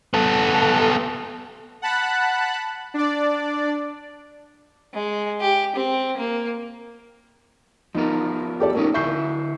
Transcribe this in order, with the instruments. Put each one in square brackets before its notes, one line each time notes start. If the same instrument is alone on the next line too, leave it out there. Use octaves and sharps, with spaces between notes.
[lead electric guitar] B3 A4
[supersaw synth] F#5 A5 B5 F#6
D4 D5
[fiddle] G#3
G4
C4
A#3
[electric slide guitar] F3 B3 A#4 [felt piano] D#4
[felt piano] G4 A4 D5
[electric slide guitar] A2 C#4 D#4 [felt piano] A#4
[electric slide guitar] D3 E4 E5 [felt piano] C#6 G6 C7